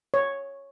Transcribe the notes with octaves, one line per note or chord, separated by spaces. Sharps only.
C#5